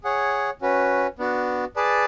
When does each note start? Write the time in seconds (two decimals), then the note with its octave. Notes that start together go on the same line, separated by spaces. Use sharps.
0.04 G#4 C#5 F#5
0.62 C#4 F#4 B4
1.19 B3 D4 F#4
1.76 G#4 B4 D5 A5